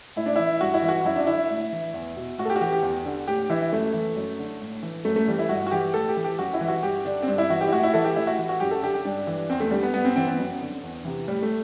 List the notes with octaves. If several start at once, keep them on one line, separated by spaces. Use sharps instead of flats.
A2 E4
D4
E3 E4
G2 F#4
E4
E3
F#4
F#2 E4
D4
D3 E4
A2
E3
E2
B2
A2 F#4
A4
G4
F#4
E3 G4
G4
E2
D3
A2 G4
E3 E4
F#2 A3
E3
F#2
D3
A2
E3
F#2 A3
A3
E3 G3
E4
G2 F#4
F#4
E3 G4
A2 A4
G4
E3
G4
F#2 F#4
E4
E3
F#4
G2 G4
D3 D4
C4
G2 D4
E4
E3 F#4
G4
E4
A2 F#4
E4
E3 A4
G4
A2 E4
F#4
E3
F#4
F#2 G4
A4
D3 G4
G4
G2 D4
E3
E2 C4
A3
D3 G3
B3
G2 B3
C4
E3 C4
B3
F#2
D3
E2
C3 E3
A2 G3
A3